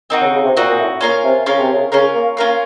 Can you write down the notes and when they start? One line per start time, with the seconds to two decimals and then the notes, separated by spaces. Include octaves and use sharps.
0.10 D#3 C4 D#4 F#4
0.21 C#3
0.34 C#3
0.44 C3
0.56 A#2 C4 D#4 F#4
0.67 A#2
0.79 A2
1.01 A#2 C#4 F4 A#4 F5
1.24 C3
1.46 C#3 C#4 F4 A#4 F5
1.59 C3
1.72 C#3
1.92 C#3 C#4 F4 A#4 F5
2.14 A#3
2.37 A#3 C#4 F4 A#4 F5